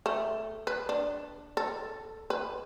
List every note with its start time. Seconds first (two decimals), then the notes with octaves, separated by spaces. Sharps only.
0.06 A3
0.67 B4
0.89 D4
1.57 A4
2.30 B4